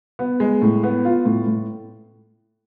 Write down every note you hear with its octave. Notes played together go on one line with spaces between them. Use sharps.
B3
G#3
A2
B3
F4
A2
A2